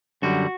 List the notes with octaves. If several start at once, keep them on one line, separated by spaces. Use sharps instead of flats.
F#2 D3 G3 F#4